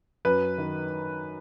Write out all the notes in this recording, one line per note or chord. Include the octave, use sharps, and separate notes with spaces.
F#2 B4
D#3